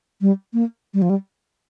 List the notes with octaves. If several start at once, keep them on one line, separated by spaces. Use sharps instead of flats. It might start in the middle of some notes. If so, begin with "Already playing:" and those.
G3
A#3
G3
F3
G3